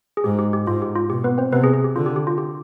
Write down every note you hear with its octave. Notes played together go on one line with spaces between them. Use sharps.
G#4
G#2 G4
G4
G4
G#2 F4
G4
F4
B2 G4
B3 B4
C4 C5
C3 B3 B4
G#4
G#4
G4
D3 F4
G4
G4
F4
G4